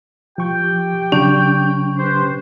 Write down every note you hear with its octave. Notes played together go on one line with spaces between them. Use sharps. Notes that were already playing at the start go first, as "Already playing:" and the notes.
F3 G4 G5 C#6
C#3 F#3 C#4 D4
G4 B4 C5